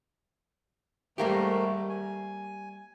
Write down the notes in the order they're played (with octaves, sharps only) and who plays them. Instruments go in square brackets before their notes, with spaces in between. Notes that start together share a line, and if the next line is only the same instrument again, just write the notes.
[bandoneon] G#2 D#3 A3 [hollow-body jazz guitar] G3 A#3 G4
[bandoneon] G#5